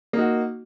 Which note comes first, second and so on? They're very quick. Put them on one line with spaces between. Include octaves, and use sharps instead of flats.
A#3 D#4 F#4